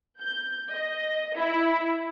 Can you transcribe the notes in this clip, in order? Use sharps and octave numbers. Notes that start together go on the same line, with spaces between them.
G6
D#5
E4